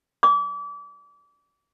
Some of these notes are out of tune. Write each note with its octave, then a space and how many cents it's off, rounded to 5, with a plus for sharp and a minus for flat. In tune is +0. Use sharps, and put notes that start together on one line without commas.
D6 -35